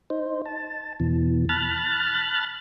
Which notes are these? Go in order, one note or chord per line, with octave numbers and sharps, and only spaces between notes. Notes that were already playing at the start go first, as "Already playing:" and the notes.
D#4 C5
A5
E2 B2 E3
A5 B5 F6 F#6 A6